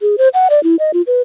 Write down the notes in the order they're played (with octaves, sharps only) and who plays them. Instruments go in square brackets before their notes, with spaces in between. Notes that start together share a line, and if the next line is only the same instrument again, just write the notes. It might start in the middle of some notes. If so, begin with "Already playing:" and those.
[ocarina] G#4
C5
F#5
D5
E4
D#5
F4
B4